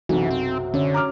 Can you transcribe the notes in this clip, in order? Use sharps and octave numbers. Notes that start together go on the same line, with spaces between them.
B1 F#2 C3 E3 F#4
C4
D3 C#4 C#5 E5
A#5 D6 F6